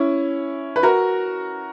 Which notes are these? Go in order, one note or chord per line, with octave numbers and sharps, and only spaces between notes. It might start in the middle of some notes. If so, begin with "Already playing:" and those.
Already playing: C#4 E4
B4
F#4 A#4